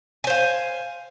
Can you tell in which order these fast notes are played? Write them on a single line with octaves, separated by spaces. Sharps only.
G#5 C5 F5